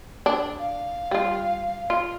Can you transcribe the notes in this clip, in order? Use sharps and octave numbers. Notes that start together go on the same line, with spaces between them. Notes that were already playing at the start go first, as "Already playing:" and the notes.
D4
F5
G3 F4
F4